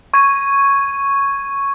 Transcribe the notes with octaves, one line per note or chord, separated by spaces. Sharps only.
C#6 G#6 D#7